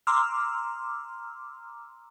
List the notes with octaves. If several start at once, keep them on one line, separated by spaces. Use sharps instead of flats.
A#5 C6 D6 E6 F6